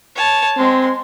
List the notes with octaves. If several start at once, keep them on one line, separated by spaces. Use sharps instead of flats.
C#5 A5
G#3 C4 C6